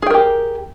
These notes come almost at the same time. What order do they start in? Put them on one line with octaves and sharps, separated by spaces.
G#4 G5 A#4 G4